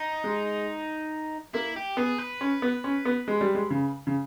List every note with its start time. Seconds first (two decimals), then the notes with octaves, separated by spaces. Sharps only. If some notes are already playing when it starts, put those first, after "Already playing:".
Already playing: D#4
0.24 G#3
1.54 A#3 E4
1.76 G4
1.97 B3 G#4
2.18 B4
2.41 C#4
2.62 B3
2.84 C#4
3.05 B3
3.28 G#3
3.41 G3
3.55 G#3
3.70 C#3
4.07 C#3